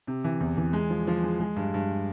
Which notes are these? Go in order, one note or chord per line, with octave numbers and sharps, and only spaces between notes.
C3
E3
E2
E3
G#3
F3
F3
G#3
G#3
G2
G2